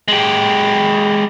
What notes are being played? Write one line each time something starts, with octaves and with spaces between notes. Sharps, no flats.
G#3 G4